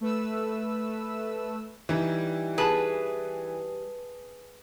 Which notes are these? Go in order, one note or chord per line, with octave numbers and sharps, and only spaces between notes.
A3 B4 E6
E3 G3 D#4
G#4 B4 A5